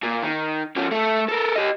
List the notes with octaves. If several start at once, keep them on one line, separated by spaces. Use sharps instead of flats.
A#2
D#3
F3 C#4
A3 A4
A4 A#4
G4 D#5